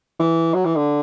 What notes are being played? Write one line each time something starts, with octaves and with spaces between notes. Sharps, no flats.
E3
F#3
E3
D3